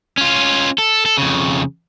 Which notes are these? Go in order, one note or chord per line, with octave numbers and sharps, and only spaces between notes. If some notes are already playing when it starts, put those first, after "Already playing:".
C#4 F4
A4
A4
F2 C#3